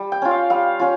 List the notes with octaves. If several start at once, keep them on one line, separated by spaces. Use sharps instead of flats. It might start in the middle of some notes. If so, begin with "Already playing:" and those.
Already playing: G3
G5
C#4 F4
F5
G3 F5
C#4 F4